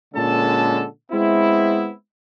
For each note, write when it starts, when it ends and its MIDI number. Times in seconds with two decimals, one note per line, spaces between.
0.15 0.84 46
0.15 0.84 50
0.15 0.84 56
0.15 0.84 61
0.15 0.84 69
0.15 0.84 81
1.12 1.92 56
1.12 1.92 59
1.12 1.92 60
1.12 1.92 64